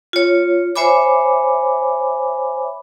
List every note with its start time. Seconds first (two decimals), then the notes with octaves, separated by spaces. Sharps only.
0.13 F4 C#5
0.76 C5 C#5 E5 G#5 B5 D6